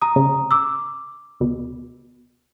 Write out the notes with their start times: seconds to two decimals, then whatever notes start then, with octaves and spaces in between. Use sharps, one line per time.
0.02 A#5 D#6
0.16 C#3
0.51 D6 E6
1.40 D2 B2